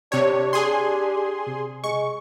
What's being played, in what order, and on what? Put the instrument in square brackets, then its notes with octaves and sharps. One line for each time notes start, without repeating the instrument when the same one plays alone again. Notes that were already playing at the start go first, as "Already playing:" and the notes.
[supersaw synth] C3 C#5 [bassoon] D4 [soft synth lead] G4
[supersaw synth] G#4 G#5 C6
[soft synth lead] C3
[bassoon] G#3 [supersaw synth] C#6